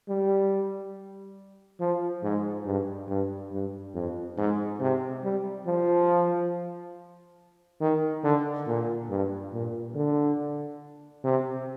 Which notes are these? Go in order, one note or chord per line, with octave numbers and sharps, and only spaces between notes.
G3
F3
G#2
G2
G2
G2
F2
G#2
C3
G3
F3
D#3
D3
A#2
G2
A#2
D3
C3